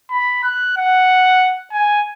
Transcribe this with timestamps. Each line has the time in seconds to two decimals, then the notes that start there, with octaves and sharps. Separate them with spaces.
0.10 B5
0.43 F#6
0.77 F#5
1.72 G#5